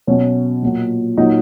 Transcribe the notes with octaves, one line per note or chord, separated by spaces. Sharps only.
B2 F#3 C#4 C#5
A#2 F#3
A#2 F#3 D#4 D#5